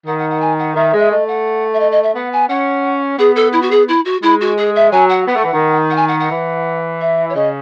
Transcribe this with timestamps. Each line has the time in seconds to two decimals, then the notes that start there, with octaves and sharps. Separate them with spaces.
0.07 D#3 F#5
0.19 F#5
0.30 F#5
0.41 G#5
0.59 F#5
0.76 D#3 E5
0.94 G#3 E5
1.11 A3 D#5
1.28 F#5
1.73 E5
1.80 D#5
1.92 D#5
2.03 E5
2.15 B3 F#5
2.33 G#5
2.49 C#4 F#5
3.18 B3 G#4
3.36 A4
3.53 E4
3.62 F#4
3.71 G#4
3.88 E4
4.05 F#4
4.22 G#3 E4
4.41 F#4
4.57 G#4
4.76 E5
4.92 F#3 G#5
5.09 F#5
5.27 B3 F#5
5.36 A3
5.44 E3
5.54 D#3
5.90 F#5
5.96 G#5
6.08 F#5
6.20 F#5
6.31 E3
7.01 E5
7.29 C#5
7.35 C#3 D#5